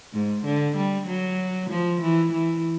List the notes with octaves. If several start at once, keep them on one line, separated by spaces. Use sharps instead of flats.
G#2
D3
G3
F#3
F3
E3
E3